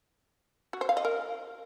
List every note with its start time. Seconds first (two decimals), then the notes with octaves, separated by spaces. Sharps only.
0.73 F#4
0.81 C5
0.89 F5
0.97 D#5
1.05 A#4